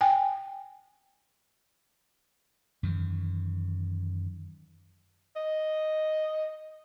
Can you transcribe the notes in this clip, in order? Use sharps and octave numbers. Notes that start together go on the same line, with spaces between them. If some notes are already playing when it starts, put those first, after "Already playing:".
G5 G#5
F#2 D#3 E3
D#5